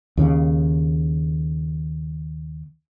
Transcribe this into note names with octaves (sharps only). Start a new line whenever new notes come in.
D#2 C#3